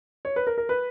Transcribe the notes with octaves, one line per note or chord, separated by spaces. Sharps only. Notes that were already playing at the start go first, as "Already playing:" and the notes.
C#5
B4
A#4
A#4
B4